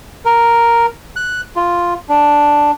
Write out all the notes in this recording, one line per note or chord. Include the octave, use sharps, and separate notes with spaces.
A#4
F#6
F4
D4